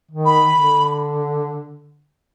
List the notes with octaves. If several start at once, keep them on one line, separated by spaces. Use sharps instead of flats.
D#3
B5
D3